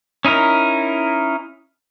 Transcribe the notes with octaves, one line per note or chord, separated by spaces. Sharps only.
C#4 D#4 E4 A#4